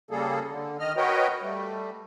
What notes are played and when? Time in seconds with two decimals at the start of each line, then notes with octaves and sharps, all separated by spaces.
0.11 C#3 G3 A#3 G#4 A4
0.51 D3
0.80 D#3 D#5 F6
0.97 F#4 A#4 B4 C#5 D#5 G5
1.42 G3 A3